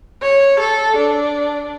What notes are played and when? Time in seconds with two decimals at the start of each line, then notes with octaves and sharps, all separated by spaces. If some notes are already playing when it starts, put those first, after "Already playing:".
0.22 C#5
0.60 A4
0.97 D4